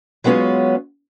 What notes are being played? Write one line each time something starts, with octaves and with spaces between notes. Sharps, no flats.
F#3 G#3 B3 C#4 F4